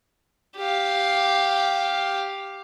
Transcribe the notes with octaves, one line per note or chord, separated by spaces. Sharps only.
G4 F5